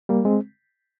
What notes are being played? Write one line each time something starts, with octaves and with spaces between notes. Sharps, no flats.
G3 A#3
G#3 C4